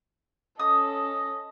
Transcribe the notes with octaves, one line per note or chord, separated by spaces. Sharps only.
C#4 A4 D#5 D#6